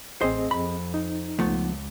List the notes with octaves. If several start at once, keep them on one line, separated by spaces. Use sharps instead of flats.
A1 C4 G#4 C5 D#5
F2 B5
D#4
C#2 F3 A3 B3